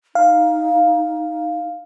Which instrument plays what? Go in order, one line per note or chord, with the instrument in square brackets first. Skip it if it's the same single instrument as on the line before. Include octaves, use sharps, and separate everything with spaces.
[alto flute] D#4 [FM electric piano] F5